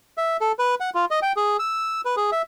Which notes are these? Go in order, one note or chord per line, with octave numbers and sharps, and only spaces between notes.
E5
A4
B4
F#5
F4
D#5
G5
G#4
E6
B4
G#4
E5